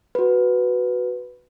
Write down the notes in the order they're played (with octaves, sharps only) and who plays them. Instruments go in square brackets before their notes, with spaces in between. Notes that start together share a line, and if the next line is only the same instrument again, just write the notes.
[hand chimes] F#4 B4